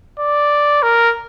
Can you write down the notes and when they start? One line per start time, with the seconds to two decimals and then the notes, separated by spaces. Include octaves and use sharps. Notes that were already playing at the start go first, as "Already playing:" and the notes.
0.19 D5
0.82 A#4